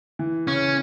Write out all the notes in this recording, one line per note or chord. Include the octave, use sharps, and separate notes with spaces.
E3
C#3 C#4